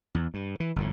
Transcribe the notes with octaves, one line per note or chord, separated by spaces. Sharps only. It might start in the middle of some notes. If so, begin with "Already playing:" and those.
E2
G2
E3
G1 F2 A2